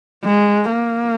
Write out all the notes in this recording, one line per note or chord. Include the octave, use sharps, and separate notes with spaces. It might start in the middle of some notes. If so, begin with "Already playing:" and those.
G#3
A#3